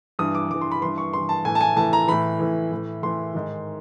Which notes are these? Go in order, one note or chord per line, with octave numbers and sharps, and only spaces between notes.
G2 E3 D#6
D6
G2 E3 D6
C6
B5
G2 E3 C6
C#6
G2 E3 C6
A5
A2 E3 G#5
A5
G#5
A2 E3 A5
A#5
A2 E3 B5
A2 E3
A2 E3
A2 E3 C6
G#2 D#3